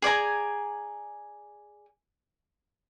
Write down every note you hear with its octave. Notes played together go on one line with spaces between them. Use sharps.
G#4 D5 G#5 A#5